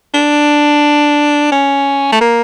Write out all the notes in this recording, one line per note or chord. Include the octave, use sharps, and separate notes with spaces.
D4
C#4
A3
A#3